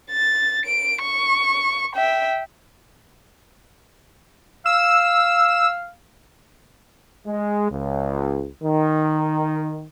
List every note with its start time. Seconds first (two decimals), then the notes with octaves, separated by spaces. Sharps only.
0.11 A6
0.65 D7
1.01 C#6
1.95 E5 G5
4.66 F5 E6
7.26 G#3
7.70 C#2
8.63 D#3